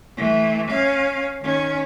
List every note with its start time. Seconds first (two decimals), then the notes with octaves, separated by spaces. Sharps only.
0.17 E3 A3
0.70 C#4 F5
1.41 D#3 C#4